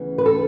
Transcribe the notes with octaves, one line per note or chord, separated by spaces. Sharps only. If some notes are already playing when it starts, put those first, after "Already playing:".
Already playing: D2 C#3 E3 B3
B4
A4